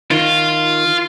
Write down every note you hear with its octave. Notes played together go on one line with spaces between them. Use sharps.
D#3 F4